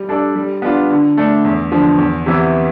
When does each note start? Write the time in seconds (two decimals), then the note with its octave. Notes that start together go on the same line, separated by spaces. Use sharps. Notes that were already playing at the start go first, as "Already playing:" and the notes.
Already playing: G3
0.09 D4 A4 D5
0.36 G3
0.62 B3 D4 F4
0.90 D3
1.18 A3 D4
1.45 E2
1.72 D3 F3
1.98 E2
2.26 C3 E3 B3 E4